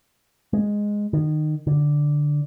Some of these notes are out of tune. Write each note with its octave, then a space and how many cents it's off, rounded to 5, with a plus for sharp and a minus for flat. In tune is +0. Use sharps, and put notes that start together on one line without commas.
G#3 -5
D#3 -25
D3 +0